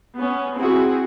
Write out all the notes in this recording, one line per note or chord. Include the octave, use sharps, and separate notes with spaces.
B3 C#4
C4 E4 F#4 G#4